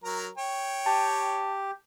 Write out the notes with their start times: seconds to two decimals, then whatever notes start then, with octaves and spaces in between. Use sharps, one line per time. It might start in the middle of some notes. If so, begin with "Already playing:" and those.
0.04 F#3 A#4 A#5
0.38 C#5 G5
0.86 G4 A5